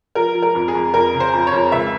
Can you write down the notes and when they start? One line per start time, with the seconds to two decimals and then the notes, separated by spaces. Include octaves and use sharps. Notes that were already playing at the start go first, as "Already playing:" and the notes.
0.15 F3 A#4
0.35 F3
0.42 A#4
0.55 F2
0.68 G#4
0.75 F2
0.94 F2 A#4
1.14 C#3
1.20 C5
1.33 F2
1.47 C#5
1.52 F2
1.72 C#2 E5